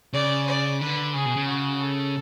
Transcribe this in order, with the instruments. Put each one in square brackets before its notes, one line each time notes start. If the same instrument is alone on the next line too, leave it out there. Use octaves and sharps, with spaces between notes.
[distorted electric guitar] C#3 [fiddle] D5
[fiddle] D5
[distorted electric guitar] D3 [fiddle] B4
[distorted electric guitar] C#3 [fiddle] G#4
[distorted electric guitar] B2
C#3
[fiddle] F#4
A4